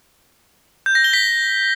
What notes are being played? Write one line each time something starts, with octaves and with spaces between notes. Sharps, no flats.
G6
A#6
G7
B6